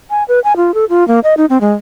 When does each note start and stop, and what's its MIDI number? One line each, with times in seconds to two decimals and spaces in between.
0.10 0.23 80
0.28 0.40 71
0.44 0.56 80
0.56 0.74 65
0.74 0.85 69
0.90 1.06 65
1.08 1.20 58
1.24 1.34 75
1.37 1.45 63
1.50 1.58 60
1.61 1.72 56